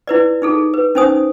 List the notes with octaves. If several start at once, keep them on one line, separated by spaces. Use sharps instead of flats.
E4 B4 D5
D#4 G#4 A4
B4
C#4 D#4 C5 G#5 D#6